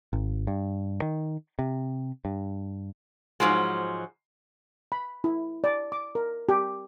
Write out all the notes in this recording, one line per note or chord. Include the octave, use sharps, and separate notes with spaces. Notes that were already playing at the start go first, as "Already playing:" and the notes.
G#1
G2
D#3
C3
G2
G#2 C#3 F3 F#3 G#3
B5
E4
D5
D6
A#4
G4